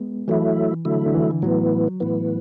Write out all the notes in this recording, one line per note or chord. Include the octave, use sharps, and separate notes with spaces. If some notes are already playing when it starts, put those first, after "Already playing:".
Already playing: G#3 B3
E3 F#3 A3 E4
D3 F#3 A3 E4
D3
E3
A2 E3 F#3 B3
A2 E3 B3